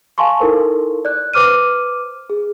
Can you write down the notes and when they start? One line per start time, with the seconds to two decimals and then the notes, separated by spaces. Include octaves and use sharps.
0.18 F5 G#5 A5 C6 C#6
0.40 D#4 E4 A4 A#4 C5
1.05 D5 F#6
1.34 B4 C5 D6 F6 D#7
2.30 G#4